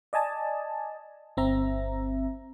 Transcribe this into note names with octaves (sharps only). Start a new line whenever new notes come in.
D5 D#5 G#5 A5
G1 C4 E5 A#5